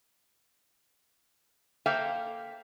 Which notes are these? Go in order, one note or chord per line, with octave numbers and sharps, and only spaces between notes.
A#3 A4 C5 E5 F5 G5